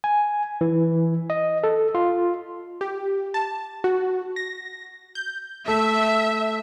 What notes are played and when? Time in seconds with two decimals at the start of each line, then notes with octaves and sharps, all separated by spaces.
0.04 G#5
0.61 E3
1.30 D#5
1.64 A4
1.95 F4
2.81 G4
3.34 A5
3.84 F#4
4.36 A#6
5.15 G6
5.68 A3 E5